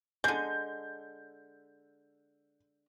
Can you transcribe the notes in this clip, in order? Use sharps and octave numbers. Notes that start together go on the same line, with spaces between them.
D3 G#3 G6